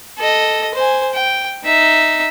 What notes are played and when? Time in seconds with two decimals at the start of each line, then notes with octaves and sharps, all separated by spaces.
0.18 A4 D#5
0.74 C5 G#5
1.13 G5
1.64 D#4 E5